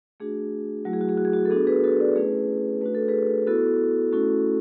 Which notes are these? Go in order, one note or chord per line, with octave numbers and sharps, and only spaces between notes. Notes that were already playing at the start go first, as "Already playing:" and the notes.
A3 D4 F#4 G#4
F#3 A3 E4 F#4
G#4
F#4
G#4
F#4
G#4
F#4
A4
B3 D4 F#4 G#4
G#4 B4
F#4 A4
B4 D5
A3 C#4 E4 G#4 B4
A3 D4 F#4 B4
A4
G#4 B4
B3 E4 F#4 A4
A3 C#4 E4 F#4 A4